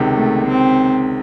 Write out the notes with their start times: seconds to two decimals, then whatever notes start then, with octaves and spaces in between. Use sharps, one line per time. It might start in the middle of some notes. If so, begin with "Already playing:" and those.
Already playing: C#2 C3 D#3
0.16 A3
0.46 C4